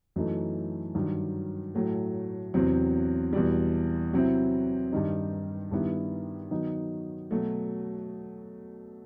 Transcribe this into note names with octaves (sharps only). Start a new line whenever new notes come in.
F#2 E3 A3 D#4
G2 D#3 F#3
A2 F#3 A3
E2 C3 F#3 C4
E2 B2 G3
C3 F#3 C4 E4
G2 D#3 G3 D#4
G2 D#3 G3 B3 E4
D#3 F#3 B3 D#4
B2 F#3 A3